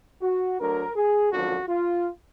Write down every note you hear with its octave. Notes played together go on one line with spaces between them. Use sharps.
F#4
D2 D3 F#3 A#4
G#4
G#1 F#2 D3 F3 F#4
F4